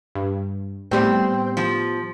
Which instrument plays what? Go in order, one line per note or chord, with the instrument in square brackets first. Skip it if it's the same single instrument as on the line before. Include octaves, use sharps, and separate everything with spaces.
[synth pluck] G2
[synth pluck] A2 G3 [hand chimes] B3 G4 C6 [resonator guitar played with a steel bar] C4
[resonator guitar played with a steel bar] F3